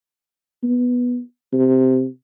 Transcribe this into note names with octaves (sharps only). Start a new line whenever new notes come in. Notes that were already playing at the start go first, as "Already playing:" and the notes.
B3
C3